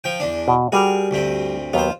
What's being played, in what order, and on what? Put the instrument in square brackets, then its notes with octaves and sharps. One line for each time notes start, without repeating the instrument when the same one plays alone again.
[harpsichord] F3 G5
E2 D4
[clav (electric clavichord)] B2
[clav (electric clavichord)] G3 F#4 [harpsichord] G#4 A#4
[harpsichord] D2 G2 C4
[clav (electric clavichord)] D#2 F#3 B3 [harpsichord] F4 C5